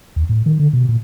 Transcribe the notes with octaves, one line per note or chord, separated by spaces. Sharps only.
D#2
A2
D#3
D3
B2
A#2